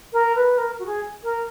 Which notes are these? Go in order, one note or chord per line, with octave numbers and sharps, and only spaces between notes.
A#4
B4
A#4
F#4
G#4
A#4